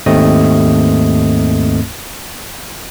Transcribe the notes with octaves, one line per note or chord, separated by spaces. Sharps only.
D#2 G#2 A3 C4 D#5 D#6